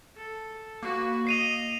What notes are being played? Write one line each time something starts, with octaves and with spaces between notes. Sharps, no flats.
A4
A#3 F#4 B4
D#5 C7 D#7 F7